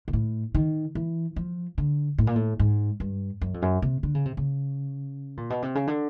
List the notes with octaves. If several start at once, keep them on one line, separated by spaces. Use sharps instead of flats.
A#2
A2
D#3
E3
F3
D3
A2
A#2
A2
G#2
G2
F#2
F2
F#2
C3
D3
C#3
C3
C#3
A#2
B2
C3
C#3
D3